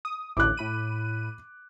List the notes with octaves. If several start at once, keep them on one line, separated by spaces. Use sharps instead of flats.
D#6
A1 D2 A2 D6 F#6
A2 B5 D#7